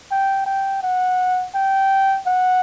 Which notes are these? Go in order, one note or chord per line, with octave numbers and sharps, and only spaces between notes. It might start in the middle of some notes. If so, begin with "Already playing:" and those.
G5
G5
F#5
G5
F#5